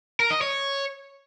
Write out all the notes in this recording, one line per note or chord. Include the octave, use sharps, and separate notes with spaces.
A#4
D#5
C#5